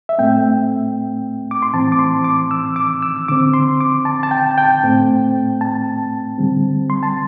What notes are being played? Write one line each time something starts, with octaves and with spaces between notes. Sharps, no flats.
E5
A2 A3 C4 G5
D6
C6
A2 E3 C4 A5
D6
C6
D6
E6
D6
E6
D3 C4 D6
C6
D6
A5
A5
G5
A5
G5
A2 A3 C4
A5
D3 G3 C4
C6
A5